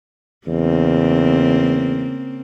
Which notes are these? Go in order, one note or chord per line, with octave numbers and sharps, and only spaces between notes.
E2 C#3 A#3 C4